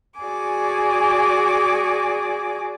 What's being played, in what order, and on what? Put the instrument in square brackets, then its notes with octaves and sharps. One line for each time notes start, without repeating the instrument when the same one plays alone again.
[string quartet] F#4 G#4 D5 G#5 D6